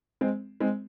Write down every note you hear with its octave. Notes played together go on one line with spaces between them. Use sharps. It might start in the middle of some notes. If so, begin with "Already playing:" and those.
G#3 C4
G#3 C4